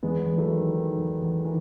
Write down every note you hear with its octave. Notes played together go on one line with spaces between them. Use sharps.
E2 G#3 B3
E2
F#3 A3
D#3
D#3
E2
E2
D#3 E3